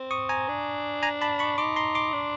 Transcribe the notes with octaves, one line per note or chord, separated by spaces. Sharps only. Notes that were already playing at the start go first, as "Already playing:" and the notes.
Already playing: C4
C#6 D#6
G#5 A#5
D4
G#5 A#5
A5 B5
B5 C#6
D#4 C6 D6
A#5 C6
C6 D6
D4